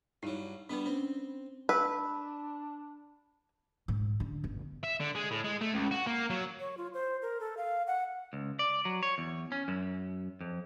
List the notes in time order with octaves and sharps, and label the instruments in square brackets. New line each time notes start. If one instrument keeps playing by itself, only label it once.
[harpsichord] G2 F#3 [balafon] D#4 E4
[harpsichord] G3 B3 [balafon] D4 B4
[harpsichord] C4 [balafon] C#4
[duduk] D4 [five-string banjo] B4 [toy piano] E6
[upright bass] G#2
D3
G1
[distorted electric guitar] E5
D3
G#3
A2
G#3
A3
C#2
F#4
A#3
F#3
[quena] C#5
F4
C5
A#4
A4
F5
F#5
[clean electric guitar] C#2
D5
F#3
C#5
E2
C#4
F#2
F2